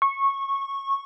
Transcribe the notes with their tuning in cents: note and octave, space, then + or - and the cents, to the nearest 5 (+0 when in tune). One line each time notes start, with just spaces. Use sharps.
C#6 -15